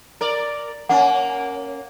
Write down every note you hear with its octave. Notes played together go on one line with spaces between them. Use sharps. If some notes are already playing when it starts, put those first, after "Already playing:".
A#4 D5
A#3 C#4 F#5